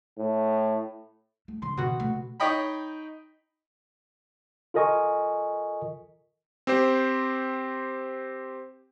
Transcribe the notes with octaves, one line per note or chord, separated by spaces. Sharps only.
A2
A3
C#3 E3 C6
B2 D#3 C4 F#4
C3 A3
D#4 C#5 D#5 G5 B5
F4 A4 A#4 D#5 G#5 C#6
C4 G4 C5